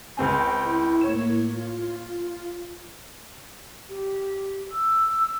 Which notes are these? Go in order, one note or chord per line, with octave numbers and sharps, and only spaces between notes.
C#2 C4 G5 G#5
E4
A2 A#3 C#5 E7
F4
G4
E6